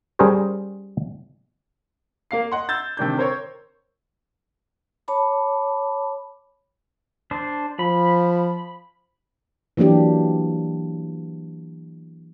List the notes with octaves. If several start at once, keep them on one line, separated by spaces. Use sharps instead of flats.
G3 C#4 G#4 A#4 C5 C#5
A#3 F5 C7
D#5 F#5 C6
E6 G6 A6
C3 D#3 D4 G6
A#4 C5 C#5 C#6
C#5 A5 B5 D6
D4 C5
F3 B5
E3 F#3 A#3 D4 G4